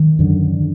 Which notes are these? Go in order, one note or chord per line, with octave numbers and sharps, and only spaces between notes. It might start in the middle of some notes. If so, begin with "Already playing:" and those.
Already playing: D#3
F#2 D3